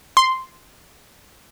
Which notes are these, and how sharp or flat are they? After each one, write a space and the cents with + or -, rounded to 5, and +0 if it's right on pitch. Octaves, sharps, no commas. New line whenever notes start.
C6 -5